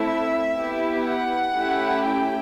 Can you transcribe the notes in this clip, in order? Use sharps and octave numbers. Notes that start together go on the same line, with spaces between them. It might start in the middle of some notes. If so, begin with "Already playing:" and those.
Already playing: A3 C4 E4 A4 E5
B3 E4 G4
F#5
A3 C#4 E4 G4
G5